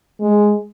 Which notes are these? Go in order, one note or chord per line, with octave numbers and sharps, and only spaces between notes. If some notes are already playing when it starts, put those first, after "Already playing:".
G#3